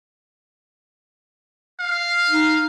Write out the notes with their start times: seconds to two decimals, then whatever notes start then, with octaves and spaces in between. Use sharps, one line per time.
1.80 F5
2.30 D#4